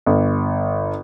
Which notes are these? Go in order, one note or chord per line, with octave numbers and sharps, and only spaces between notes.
G1